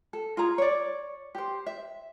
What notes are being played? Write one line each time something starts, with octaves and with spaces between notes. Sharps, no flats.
A4
F4 G#4 A#5
C#5 D5
G4 C5
E5